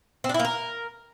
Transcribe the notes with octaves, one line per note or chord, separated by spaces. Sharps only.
C4
D4
E4
A#3
A#4